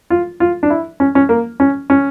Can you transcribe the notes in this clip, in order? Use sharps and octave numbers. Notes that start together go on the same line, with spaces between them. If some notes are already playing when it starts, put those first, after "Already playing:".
F4
F4
D4
E4
C#4
C#4
A#3
C#4
C#4